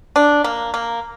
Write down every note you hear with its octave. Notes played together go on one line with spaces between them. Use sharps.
D4
A#3
A#3